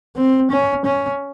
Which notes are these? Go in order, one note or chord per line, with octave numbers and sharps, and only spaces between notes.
C4
C#4
C#4